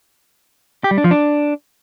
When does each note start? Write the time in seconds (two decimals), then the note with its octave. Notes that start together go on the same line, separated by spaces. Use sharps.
0.84 G4
0.91 G3
0.98 D4
1.04 F3
1.11 D4